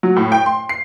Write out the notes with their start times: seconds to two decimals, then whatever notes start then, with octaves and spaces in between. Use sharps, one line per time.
0.03 F#3
0.16 A2
0.32 G5
0.46 C6
0.69 C7